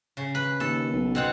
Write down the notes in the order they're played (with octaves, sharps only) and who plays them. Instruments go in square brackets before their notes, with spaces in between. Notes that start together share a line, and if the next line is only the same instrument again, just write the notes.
[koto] C#3
B4
[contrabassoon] D#2 [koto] A4
[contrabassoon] B1
[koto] B2 C4 F#5